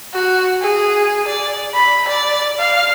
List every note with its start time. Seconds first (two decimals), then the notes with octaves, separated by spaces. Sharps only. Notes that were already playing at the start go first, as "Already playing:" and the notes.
0.14 F#4
0.62 G#4
1.27 D5
1.75 B5
2.09 D5
2.59 F5